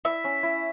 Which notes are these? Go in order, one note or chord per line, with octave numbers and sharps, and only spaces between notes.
E4 E5
C#4
E4